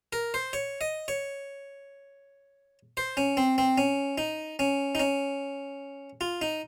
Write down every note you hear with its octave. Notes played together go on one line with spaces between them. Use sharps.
A#4
C5
C#5
D#5
C#5
C5
C#4
C4
C4
C#4
D#4
C#4
D#4
C#4
F4
D#4